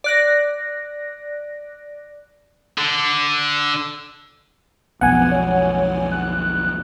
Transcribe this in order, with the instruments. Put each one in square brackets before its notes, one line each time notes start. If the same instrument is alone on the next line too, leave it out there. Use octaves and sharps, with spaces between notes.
[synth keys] D5 F#6 A#6
[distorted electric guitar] D3
[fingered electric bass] B1 F2 [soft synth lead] B3 [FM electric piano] F#5 G#5
[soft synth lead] C#5
F#6